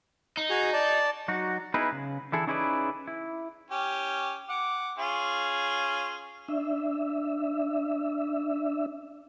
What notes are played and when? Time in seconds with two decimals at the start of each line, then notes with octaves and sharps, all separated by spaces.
0.37 D#4
0.50 F#4 G#4
0.73 D5 A5
1.28 F#3 D#4 F#4
1.74 B3 D#4 E4 G#4 B4
1.92 C#3
2.32 D3 E3 E4 G#4 A4
2.47 C#4 D#4 E4 G#4 B4 D5
3.08 E4
3.71 C#4 G4
4.49 F#5 D6
4.99 C#4 F4 G#4
6.48 D4 E5